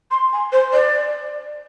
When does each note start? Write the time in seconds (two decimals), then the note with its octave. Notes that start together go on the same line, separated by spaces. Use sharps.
0.11 C6
0.33 G#5
0.52 C5
0.73 D5